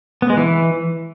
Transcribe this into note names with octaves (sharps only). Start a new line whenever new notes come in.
B3
G#3
E3